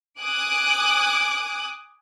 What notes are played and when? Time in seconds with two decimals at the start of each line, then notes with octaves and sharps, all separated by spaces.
0.21 G#5 D6 D#6 F#6